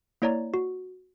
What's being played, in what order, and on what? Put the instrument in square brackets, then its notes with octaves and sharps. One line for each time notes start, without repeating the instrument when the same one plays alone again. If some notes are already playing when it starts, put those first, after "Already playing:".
[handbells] A#3 E4 C#5 D5 A#5
F#4